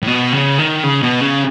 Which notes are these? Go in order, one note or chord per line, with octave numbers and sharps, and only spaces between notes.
A2
B2
C#3
D#3
C#3
B2
C#3